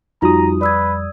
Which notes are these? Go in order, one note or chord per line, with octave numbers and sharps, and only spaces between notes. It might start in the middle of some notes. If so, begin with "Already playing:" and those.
F2 G3 D#4 F4 F#4 A#5 D#6
B4 D5 E6 G#6